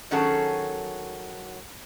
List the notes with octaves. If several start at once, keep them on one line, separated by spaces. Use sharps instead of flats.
D#3 F#3 C#4 F#4 G#4 A4